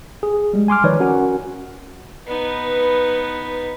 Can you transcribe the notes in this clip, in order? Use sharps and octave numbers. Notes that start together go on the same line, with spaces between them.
G#4
G3 G#3
G#5 C6 D6 F6
D#3 F3 D#4 B4 C#5 D5
C#4 F#4 A#4 F#5 G#5
B3 D#4 B4